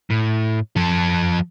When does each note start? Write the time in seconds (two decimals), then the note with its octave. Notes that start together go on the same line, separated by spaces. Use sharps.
0.10 A2
0.76 F3 A4